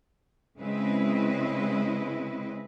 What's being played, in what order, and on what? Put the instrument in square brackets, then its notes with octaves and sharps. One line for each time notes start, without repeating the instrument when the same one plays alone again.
[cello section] C#3 G#3 C4 E4 B4 D#5